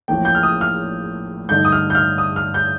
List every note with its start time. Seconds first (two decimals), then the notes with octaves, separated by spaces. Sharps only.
0.08 A1 A2 F3 A#3 G5
0.25 G6
0.35 F6
0.43 D#6
0.61 F6
1.49 G2 D3 A3 D#4 G6
1.65 D#6
1.72 F6
1.90 G6
1.95 F6
2.18 D#6
2.36 F6
2.54 G6